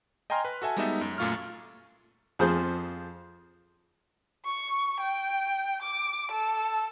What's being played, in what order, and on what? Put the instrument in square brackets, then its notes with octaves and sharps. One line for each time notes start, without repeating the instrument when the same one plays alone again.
[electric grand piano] D#5 G5 G#5 A#5 C6 F6
B4
F#4 A4 E5 G#5 A5
G3 G#3 B3 D#4 A4 E5
F#2
F#2 A#2 A3 F4 C#6 F6
[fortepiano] F2 F3 G#4 C5
[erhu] C#6
G5
D6
A4